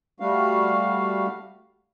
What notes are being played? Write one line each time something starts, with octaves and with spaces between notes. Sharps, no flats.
G3 A3 F#4 F5